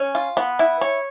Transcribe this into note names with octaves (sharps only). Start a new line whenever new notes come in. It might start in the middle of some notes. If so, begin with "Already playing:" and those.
Already playing: C#4
F4
B3
E4
C#5